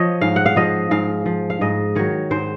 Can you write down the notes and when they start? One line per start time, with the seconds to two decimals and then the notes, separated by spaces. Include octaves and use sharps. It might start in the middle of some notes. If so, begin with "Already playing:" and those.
Already playing: F3 C#5 D#5
0.21 G#2 F5
0.36 F#5
0.46 F5
0.56 F3 D#5
0.91 G#2 F5
1.26 F3
1.50 F5
1.61 G#2 D#5
1.95 D#3 F#3 C#5
2.31 G#2 C5